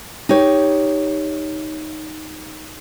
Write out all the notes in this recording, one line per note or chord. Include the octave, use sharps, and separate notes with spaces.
D#4 G4 C#5